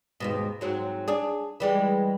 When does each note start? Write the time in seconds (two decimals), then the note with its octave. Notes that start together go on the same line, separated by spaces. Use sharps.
0.20 D#2 G#2 B2
0.61 G#2 F#3 C4
1.08 D4 G#4
1.60 E3 G3 G#3